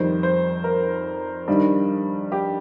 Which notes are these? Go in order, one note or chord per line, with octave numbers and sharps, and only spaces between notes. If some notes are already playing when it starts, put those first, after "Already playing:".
Already playing: F2 D#3 G3 C5
C5
A#4
G2 D#3 G3
G4